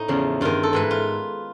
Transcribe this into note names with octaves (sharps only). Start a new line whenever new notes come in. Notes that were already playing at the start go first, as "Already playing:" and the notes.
Already playing: A2 D#4
E2 C#3 F3
G2 D#3 F4
A4
G#2 E3 B4
F4